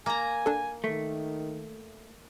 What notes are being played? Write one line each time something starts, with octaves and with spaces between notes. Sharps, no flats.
A#3 G#5 A#5
D4 A4
D#3 A3